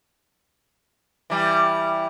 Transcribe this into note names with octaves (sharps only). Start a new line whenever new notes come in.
E3 G3